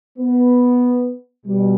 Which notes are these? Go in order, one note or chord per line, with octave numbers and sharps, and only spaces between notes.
B3
B2 G3